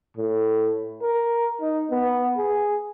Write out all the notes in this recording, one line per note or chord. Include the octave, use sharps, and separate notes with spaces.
A2
A#4
D#4
B3
G#4